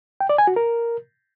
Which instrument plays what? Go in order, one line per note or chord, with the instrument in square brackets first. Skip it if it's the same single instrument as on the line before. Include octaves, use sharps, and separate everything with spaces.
[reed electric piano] G5
D5
G#5
F#4
A#4